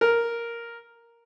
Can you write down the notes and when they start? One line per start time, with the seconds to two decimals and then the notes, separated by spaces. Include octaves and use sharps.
0.01 A#4